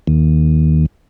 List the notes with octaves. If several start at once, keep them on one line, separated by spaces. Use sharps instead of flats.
D#2